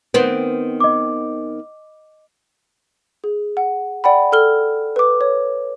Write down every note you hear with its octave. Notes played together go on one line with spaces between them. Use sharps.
D#3 B3 C4
D#5 D6
G#4
F#5
D5 F#5 G5 B5
A4 F6 G7
B4 D6
C#5